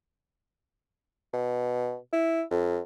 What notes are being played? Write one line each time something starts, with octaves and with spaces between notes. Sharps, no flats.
B2
E4
F2